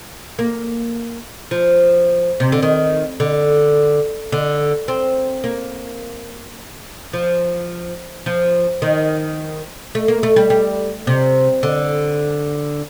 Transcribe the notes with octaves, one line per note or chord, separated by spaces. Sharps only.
A#3
F3
C3
D3
D#3
D3
D3
C4
A#3
F3
F3
D#3
A3
A#3
A3
G3
G3
C3
D3